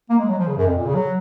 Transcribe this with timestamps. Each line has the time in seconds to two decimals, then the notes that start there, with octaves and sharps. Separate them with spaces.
0.09 A#3
0.19 G#3
0.28 F#3
0.38 F3
0.47 C#3
0.57 F#2
0.66 F2
0.76 A#2
0.86 C#3
0.95 F#3